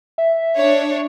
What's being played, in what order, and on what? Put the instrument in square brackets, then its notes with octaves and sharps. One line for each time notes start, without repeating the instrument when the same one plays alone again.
[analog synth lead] E5
[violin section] D4 C#5